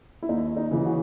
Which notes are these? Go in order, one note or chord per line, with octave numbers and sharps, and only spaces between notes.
E4
D#2 D#4
D#4
C#3 E3
F#4